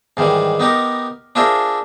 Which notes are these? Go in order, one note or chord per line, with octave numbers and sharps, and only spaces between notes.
G#2 D#3 E3 G3
B3 D#4 G4 A#4
D4 F4 G#4 A#4 C5 E5